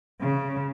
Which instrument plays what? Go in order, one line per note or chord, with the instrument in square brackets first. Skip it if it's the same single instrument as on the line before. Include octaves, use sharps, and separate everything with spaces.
[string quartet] C#3